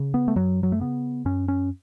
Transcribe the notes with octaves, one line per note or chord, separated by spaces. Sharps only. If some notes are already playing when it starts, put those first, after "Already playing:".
Already playing: C#3
B3
A3
F#2 F#3
F#3
A3
C#3 B3
F#2 C#4
C#4